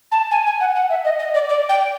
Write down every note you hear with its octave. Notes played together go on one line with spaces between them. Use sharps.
A5
G#5
G#5
F#5
F#5
E5
D#5
D#5
D5
D5
G5